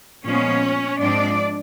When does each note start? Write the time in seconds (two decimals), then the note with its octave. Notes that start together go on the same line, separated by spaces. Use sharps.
0.25 A#2 F3 G#3 B3 C#4 C#5
0.99 G#2 F3 G#3 C4 D4 D5